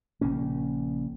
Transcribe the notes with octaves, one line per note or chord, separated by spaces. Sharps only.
A#1 C#3 A#3 C#4